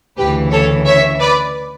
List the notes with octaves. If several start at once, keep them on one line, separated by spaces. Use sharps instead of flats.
D2 C#3 E3 G4 B4
A4 C#5
C#5 E5
B4 D5